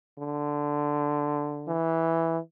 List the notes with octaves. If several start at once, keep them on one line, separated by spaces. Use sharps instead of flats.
D3
E3